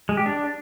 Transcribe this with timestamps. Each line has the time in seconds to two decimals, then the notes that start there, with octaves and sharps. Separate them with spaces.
0.09 G#3
0.17 G4
0.26 D4